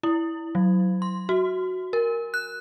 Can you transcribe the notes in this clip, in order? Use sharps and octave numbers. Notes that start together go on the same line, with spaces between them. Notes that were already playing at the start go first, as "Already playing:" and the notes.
E4
F#3
C6
F#4
A#4
F#6